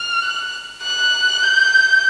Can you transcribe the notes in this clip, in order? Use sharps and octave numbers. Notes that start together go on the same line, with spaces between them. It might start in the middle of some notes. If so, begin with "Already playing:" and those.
Already playing: F6
F#6
F#6
G6